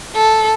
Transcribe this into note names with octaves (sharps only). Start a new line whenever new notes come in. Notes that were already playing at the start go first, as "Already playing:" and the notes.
A4